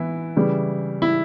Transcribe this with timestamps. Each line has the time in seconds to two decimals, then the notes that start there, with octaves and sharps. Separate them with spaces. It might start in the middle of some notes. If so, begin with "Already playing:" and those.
Already playing: E3 B3 E4
0.37 C#3 E3 G3
1.02 E4